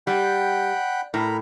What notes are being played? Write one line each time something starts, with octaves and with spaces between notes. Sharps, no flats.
G3 F#5 G5 B5
A2 A#4 A#5 B5